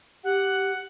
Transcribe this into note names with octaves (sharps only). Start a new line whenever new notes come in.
G4 F#5